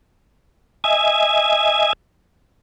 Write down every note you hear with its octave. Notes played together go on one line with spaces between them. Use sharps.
D#5 E5 G#5 G#6